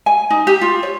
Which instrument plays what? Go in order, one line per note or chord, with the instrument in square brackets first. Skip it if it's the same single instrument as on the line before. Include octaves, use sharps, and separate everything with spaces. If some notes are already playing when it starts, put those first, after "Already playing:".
[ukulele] G#5
D#4
G4
F4
C#5